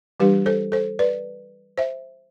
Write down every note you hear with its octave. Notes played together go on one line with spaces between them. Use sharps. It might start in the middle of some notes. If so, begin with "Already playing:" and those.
E3 G3 D4 G4 B4
A4 C5
A4 C5
B4 D5
C5 E5